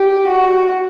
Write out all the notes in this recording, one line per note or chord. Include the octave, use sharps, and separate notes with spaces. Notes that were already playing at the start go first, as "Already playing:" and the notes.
Already playing: G4
F#4